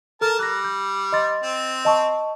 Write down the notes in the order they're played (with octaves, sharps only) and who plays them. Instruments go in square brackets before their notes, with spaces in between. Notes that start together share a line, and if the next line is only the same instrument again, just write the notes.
[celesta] A4 F6 [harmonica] A#4 A5
[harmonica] G3 [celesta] F#6 A#6
[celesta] G6
D#5 C6 A6
[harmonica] C4
[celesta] D#5 A5 C#6